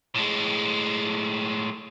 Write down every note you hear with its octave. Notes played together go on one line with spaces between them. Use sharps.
A2 G#3